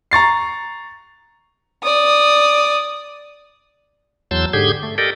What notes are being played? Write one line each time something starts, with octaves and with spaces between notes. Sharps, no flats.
A#5 C#6 A6 C7
D5 D#6
E2 F#3 A5 C6 E6 G6
G#2 D3 G4 G#4 G6 G#6
A3
G4 A4 A#4 D5 D#5 G5